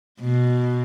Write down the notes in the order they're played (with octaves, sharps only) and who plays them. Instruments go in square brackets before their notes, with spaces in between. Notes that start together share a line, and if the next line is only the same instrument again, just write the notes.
[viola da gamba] B2